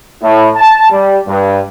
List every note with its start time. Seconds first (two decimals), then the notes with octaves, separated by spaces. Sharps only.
0.22 A2
0.56 A5
0.90 G3
1.27 G2